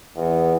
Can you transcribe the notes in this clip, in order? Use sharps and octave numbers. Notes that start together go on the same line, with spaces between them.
E2